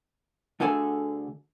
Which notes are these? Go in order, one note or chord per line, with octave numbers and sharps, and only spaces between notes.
D2 D3 G#4 A4 G#5